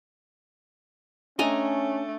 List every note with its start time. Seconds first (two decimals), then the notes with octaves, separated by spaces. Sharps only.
1.39 A3 C#4 D4 D#5 G5 G#5 A#5